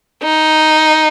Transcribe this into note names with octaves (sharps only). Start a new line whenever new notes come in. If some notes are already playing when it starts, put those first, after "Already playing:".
D#4